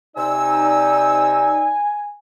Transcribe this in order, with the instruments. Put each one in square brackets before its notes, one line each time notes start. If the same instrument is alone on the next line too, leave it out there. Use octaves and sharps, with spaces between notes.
[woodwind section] C3 E6 [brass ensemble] D#4 D5 [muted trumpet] G#5